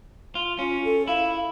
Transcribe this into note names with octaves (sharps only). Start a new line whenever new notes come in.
F4
C#4 F4
A4
E4 F5